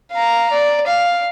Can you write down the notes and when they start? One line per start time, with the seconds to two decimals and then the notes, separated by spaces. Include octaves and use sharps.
0.12 F5 A#5
0.52 D5
0.87 F5